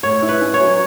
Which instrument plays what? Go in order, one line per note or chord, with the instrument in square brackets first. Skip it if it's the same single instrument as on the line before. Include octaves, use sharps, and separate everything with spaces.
[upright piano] A2 [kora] C#5
[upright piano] E4
[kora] B4
[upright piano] C#4
[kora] C#5
[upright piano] F#3